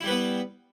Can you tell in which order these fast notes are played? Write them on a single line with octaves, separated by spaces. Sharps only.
E4 G3 B4 B3